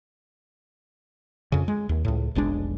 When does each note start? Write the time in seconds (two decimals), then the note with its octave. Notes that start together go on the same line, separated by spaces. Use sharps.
1.52 F2 C#3
1.68 G#3
1.89 D#2
2.05 C#2 A2
2.35 F1 B1 G#3 D4